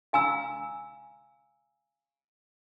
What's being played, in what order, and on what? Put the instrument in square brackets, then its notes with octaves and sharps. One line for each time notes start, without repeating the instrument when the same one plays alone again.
[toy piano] F5 G#5 A#5 E6